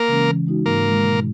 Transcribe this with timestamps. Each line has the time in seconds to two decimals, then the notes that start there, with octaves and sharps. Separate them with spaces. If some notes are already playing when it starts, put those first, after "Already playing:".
Already playing: A#3 A#4
0.08 C#3 E3 G#3 C#4
0.28 E3
0.47 G#3 D#4 F#4
0.66 G#2 A#3 A#4
0.85 D#3 G#3
1.05 B2